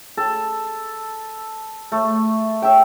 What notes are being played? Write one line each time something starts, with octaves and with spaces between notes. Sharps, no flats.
A4
A3
E5 G5